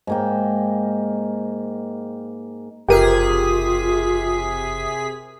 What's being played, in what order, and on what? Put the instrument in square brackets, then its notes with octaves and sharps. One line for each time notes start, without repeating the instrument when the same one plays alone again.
[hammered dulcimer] G#2 A#3 G5
[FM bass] F#1 [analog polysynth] C3 G#4 B6 [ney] F4 [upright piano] G4 A#4